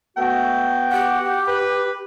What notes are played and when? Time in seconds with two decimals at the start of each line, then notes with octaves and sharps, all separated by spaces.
0.17 A3 B3 F#4 G5
0.91 G4 F#5
1.48 B4